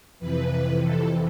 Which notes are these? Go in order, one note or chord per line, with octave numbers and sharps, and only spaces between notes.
F2 C3 E3 B4
A4